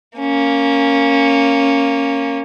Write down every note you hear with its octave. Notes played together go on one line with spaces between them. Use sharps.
A#3 C#4